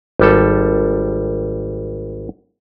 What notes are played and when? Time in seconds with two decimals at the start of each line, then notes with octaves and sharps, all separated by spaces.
0.19 G#1 G3 A4